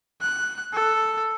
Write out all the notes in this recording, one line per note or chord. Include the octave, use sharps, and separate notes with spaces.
F#6
A4